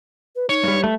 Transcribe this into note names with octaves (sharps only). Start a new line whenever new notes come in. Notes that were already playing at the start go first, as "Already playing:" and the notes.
B4
D#4 C#5
G2 G3
A3